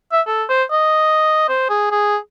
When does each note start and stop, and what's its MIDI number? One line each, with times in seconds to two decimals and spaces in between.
0.12 0.21 76
0.27 0.44 69
0.49 0.64 72
0.72 1.46 75
1.49 1.69 72
1.69 1.89 68
1.91 2.17 68